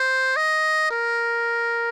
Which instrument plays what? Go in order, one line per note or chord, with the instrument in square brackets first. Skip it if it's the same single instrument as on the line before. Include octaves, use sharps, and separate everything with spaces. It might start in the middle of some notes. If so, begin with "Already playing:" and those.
Already playing: [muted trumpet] C5
D#5
A#4